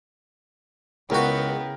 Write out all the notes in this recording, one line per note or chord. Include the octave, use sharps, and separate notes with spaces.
C#2 C#3 B3 E4 F#4 A#4 G5